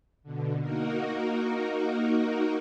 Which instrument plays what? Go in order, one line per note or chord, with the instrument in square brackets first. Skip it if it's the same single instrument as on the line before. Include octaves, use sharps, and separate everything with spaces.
[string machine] B2 D3
A#3 D#4 F#4 A#4